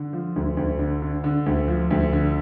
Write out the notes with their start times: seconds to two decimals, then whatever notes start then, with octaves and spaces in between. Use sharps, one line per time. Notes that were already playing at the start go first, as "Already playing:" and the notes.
Already playing: D3
0.13 F3
0.36 D2
0.57 D2
0.79 D3
1.02 D3
1.24 D3
1.46 D2
1.68 F3
1.91 D2
2.13 D3